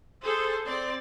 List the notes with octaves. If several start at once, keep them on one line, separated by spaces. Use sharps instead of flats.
G#4 A4 C5
C4 D5